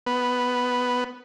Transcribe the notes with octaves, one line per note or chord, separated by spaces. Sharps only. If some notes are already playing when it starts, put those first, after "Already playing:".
B3